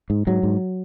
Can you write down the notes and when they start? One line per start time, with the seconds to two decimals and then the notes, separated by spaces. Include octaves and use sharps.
0.10 G#2
0.27 G#2 F#3
0.43 G#2